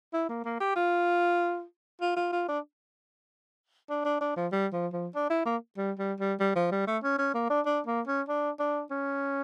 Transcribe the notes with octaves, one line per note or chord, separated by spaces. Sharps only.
E4
A#3
A#3
G4
F4
F4
F4
F4
D4
D4
D4
D4
F3
G3
F3
F3
D4
E4
A#3
G3
G3
G3
G3
F3
G3
A3
C#4
C#4
A#3
D4
D4
A#3
C#4
D4
D4
C#4